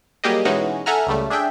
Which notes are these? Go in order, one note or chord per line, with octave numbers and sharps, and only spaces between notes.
F#3 G3 A#3 G4 G#4 D#5
B2 E3 G#3 C#4 D#4 F#4
A4 E5 F#5 G#5 A#5 F6
C#2 C#3 G3 A3
D4 G#4 E5 G5